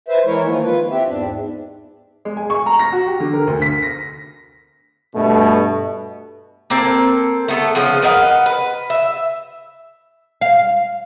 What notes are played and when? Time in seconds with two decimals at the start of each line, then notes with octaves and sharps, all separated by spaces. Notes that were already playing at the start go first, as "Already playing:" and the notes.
0.08 B4 C5 E5
0.25 E3 G#3 E4 A#4 C#5
0.45 D#3 F3 A#3
0.63 F4 B4
0.90 C4 G4 E5
1.07 E2 G#2 D4
2.25 G#3
2.37 G#5
2.50 C#6
2.66 A#5
2.79 A#6
2.92 F#4
3.06 G4
3.20 D3
3.33 A#4
3.47 D2
3.62 B6
3.82 A#6
5.15 G2 B2 A3
6.70 A#3 C4 A4
7.48 A3 B3 A4
7.75 C#3 F3 B3 C#4
8.02 A#4 B4 D#5 F#5
8.46 B4
8.90 E5
10.41 F5